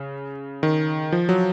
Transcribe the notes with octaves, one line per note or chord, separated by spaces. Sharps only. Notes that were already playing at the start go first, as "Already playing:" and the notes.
Already playing: C#3
D#3
F3
F#3